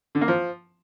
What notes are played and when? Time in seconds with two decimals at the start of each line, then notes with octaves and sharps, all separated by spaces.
0.15 D3
0.21 A#3
0.28 F3